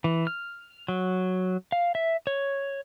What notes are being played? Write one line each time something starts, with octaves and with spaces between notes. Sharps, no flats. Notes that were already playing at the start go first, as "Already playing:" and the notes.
E3
F6
F#3
F5
E5
C#5